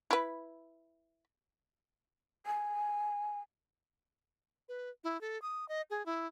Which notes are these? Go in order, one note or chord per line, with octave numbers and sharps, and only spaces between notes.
E4 B4
G#5
B4
E4
A4
D#6
D#5
G#4
E4